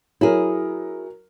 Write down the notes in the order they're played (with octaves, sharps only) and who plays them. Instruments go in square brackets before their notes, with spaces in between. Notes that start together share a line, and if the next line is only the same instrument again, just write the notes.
[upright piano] F#3 A#4 [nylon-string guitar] E4 G#4